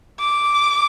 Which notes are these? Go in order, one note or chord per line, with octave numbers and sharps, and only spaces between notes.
D6